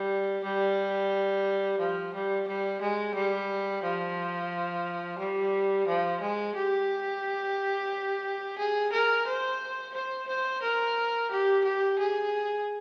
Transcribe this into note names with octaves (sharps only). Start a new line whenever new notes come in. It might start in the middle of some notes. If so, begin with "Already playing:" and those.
Already playing: G3
G3
F3
G3
G3
G#3
G3
F3
G3
F3
G#3
G4
G#4
A#4
C5
C5
C5
A#4
G4
G4
G#4